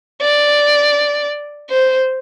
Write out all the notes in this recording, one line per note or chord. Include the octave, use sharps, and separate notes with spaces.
D5
C5